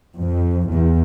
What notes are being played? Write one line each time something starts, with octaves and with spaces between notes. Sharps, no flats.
F2
E2